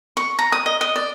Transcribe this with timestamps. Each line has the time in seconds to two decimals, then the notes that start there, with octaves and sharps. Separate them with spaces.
0.17 C#6
0.39 A#5
0.52 D#6
0.66 D#5
0.81 D#5
0.96 D5